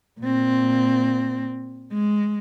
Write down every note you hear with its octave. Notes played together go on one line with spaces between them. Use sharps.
A#2 C4
G#3